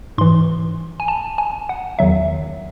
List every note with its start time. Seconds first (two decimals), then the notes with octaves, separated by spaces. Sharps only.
0.18 G#2 E3 C6
1.00 G#5
1.08 A5
1.38 G#5
1.69 F#5
1.99 E2 D#3 F#3 E5